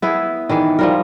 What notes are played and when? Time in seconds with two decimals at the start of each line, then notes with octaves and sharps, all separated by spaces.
0.02 B3 E4 G#4
0.49 D#3 E3 G#4 D5
0.79 F3 G3 A#4